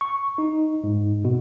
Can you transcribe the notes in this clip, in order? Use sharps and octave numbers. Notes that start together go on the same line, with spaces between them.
C#6
D#4
G#2
B2